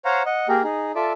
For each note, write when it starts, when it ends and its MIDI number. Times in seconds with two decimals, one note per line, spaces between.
0.05 0.23 72
0.05 0.23 73
0.05 0.23 77
0.05 0.23 78
0.05 0.23 82
0.26 0.48 75
0.26 0.48 78
0.49 0.63 58
0.49 0.63 67
0.49 0.63 68
0.49 0.63 70
0.64 0.92 63
0.64 0.92 68
0.95 1.13 65
0.95 1.13 69
0.95 1.13 74
0.95 1.13 76